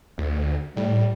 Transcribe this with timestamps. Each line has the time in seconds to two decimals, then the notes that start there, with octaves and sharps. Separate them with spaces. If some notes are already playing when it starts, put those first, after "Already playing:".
0.18 D2
0.77 A2 G3